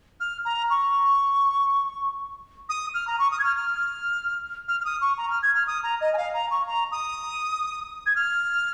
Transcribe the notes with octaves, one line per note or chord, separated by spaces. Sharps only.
F6
A#5
C#6
D#6
F6
A#5
C#6
D#6
G#6
F6
F6
F6
F6
D#6
C#6
A#5
F6
G#6
F6
D#6
A#5
D#5
G#5
F5
A#5
C#6
A#5
D#6
G#6
F6